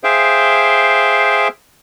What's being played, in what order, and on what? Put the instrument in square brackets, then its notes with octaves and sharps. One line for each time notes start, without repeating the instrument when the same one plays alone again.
[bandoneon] G#4 C5 E5 F5 G5